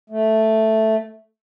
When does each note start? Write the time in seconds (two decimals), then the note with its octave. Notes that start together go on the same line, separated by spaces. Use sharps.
0.10 A3